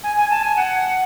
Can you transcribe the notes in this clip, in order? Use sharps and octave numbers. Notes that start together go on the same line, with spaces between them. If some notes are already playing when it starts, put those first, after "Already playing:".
G#5
G#5
A5
G#5
F#5